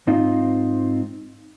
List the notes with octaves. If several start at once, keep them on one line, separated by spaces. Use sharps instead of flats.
G#2 C4 D#4 F4